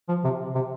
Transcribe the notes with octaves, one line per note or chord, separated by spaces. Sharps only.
F3
C3
C3